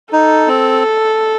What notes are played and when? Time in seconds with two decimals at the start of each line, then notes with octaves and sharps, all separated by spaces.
0.13 D#4 A4
0.47 C4